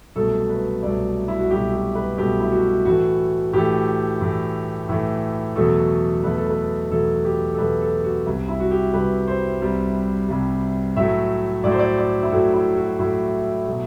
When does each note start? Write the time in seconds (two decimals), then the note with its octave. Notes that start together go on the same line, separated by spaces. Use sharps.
0.15 C2 B2 F#3 A3 A4
0.49 B4
0.83 C2 B2 F#3 A3 D5
1.28 E4
1.39 F#4
1.51 C2 B2 F#3 A3 G4
1.73 G4
1.95 B4
2.18 C2 B2 F#3 A3 G4
2.40 E4
2.52 F#4
2.85 A2 E3 A3 F#4
3.53 A2 E3 A3 G4
4.21 A2 E3 A3
4.88 A2 E3 A3
5.56 E2 B2 F#3 A3 A4
6.24 E2 B2 F#3 A3 B4
6.37 A4
6.50 B4
6.91 E2 B2 F#3 A3 A4
7.25 G4
7.54 A4
7.58 E2 B2 F#3 A3 B4
7.81 A4
8.04 F#4
8.26 C2 C3 G3
8.49 E4
8.60 F#4
8.71 G4
8.94 C2 C3 G3 B4
9.28 C5
9.61 C2 C3 G3
10.29 C2 C3 G3
10.96 A2 F#3 A3 E5
11.64 A2 F#3 A3 D5
11.72 C5
11.79 D5
11.98 D5
12.23 E4
12.31 A2 F#3 A3 F#4
12.54 E4
12.77 F#4
12.99 A2 F#3 A3 E4
13.66 B2 F#3 A3